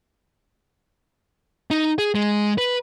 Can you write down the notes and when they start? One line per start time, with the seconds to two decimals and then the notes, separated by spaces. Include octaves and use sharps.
1.71 D#4
1.98 G#4
2.15 G#3
2.58 B4